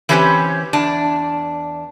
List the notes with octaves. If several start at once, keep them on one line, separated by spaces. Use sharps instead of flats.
E3 C4 C#4 G4 B4 C5
E2 D4 A5